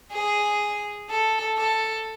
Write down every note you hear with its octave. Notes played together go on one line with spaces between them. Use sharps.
G#4
A4
A4